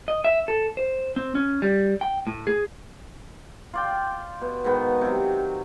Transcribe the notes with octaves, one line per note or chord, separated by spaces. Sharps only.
D#5
E5
A4
C5
C4
C#4
G3
G5
A2
G#4
F4 D5 G5
B2
G#2 B2 D#3 B3
C3 F#3